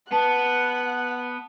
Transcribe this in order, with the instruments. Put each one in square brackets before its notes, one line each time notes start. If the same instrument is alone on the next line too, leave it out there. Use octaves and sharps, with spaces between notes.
[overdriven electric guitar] B3 [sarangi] F#5 [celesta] A5